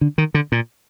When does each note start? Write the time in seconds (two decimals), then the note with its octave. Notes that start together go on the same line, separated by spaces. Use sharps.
0.01 D3
0.18 D#3
0.34 D3
0.52 A#2